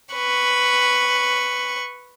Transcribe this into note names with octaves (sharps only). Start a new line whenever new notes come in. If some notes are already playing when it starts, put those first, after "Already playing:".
B4 C#6